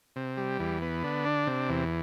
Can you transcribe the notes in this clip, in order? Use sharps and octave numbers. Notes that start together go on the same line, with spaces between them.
C3
G3
E2
B3
D3
D4
C3
E2